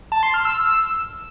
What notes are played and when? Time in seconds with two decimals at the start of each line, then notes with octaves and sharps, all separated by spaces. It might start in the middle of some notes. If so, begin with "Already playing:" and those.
0.12 A5
0.23 C6
0.34 F6
0.45 E6